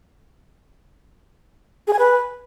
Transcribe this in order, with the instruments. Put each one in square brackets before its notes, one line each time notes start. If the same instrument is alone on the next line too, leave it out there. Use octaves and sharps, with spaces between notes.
[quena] G#4
G#5
B4